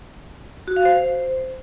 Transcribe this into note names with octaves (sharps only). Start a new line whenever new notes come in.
F#4
F5
C5